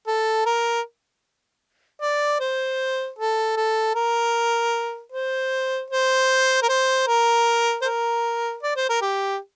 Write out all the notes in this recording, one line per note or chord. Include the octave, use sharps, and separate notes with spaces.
A4
A#4
D5
C5
A4
A4
A#4
C5
C5
A#4
C5
A#4
C5
A#4
D5
C5
A#4
G4